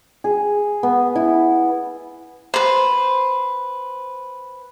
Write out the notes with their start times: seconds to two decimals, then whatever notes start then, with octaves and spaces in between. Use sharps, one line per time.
0.24 G#4
0.83 B3
1.16 E4
2.54 B4 C5